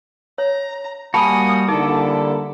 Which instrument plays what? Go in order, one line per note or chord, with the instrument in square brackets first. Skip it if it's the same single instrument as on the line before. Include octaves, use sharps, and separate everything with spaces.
[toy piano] C#5 [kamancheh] A#5
[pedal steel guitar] G3 A#3 F#4 [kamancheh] G#5 D#6 [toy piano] A5 B5
[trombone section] D3 G3 A#3 [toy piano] D#4 [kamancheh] E4 A4 [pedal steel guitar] D6